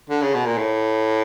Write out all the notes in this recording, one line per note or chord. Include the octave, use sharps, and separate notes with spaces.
D3
C#3
B2
A#2
A2